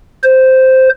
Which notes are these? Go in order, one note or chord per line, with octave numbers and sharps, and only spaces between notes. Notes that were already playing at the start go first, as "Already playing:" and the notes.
C5